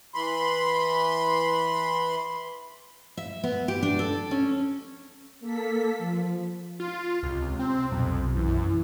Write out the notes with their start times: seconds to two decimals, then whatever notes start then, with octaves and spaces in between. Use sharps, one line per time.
0.14 E3 B5 C6
3.17 E5
3.44 B3
3.68 G4
3.83 D4
3.99 A4
4.31 C#4
5.40 A#3 A4 B6
5.98 F3
6.80 F4
7.23 C#2 C3
7.59 C4
7.92 B1 F2
8.36 F#2 E3